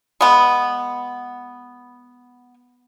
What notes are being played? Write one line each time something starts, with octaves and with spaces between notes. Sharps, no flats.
G#3 B3